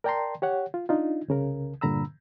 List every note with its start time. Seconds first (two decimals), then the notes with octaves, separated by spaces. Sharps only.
0.04 A#4 D5 G5 A5 A#5 C6
0.42 G4 C#5 F#5
0.74 F4
0.89 D4 D#4 F4
1.28 C2 C#3 A#4
1.81 G2 A#2 D3 A#5 B5 E6